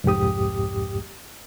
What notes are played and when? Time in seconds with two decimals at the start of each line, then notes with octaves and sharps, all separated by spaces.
0.04 C2 F2 G#2 G4 D#6